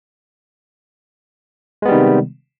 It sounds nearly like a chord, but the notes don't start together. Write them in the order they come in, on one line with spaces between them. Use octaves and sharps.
G#3 B3 G3 D#3 C3